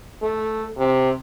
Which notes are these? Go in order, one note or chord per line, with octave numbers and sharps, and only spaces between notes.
A3
C3